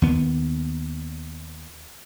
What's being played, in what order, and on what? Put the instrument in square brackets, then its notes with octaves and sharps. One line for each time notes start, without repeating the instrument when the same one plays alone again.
[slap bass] D#2 B3